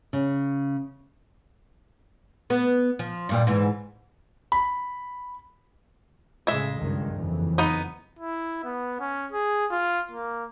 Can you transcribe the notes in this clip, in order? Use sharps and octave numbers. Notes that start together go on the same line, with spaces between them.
C#3
B3
F3
G2 A#2 G3
G#2 E3
B5
A2 C#3 G#3 E5
C#2 G2 D#3
F#1 F2 E3
B3 D#4 D#5
E4
B3
C#4
G#4
F4
A#3